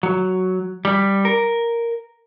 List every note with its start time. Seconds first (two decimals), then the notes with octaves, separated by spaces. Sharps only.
0.03 F#3
0.85 G3
1.25 A#4